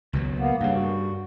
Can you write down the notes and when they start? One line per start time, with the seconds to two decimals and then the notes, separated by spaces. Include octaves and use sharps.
0.13 C#2 B2 F#3
0.39 A#3 B3
0.60 G2 C#3 G3 A#3
0.74 F#4